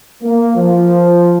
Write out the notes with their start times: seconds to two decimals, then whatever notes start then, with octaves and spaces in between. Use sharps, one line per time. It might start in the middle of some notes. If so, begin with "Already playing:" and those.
0.23 A#3
0.56 F3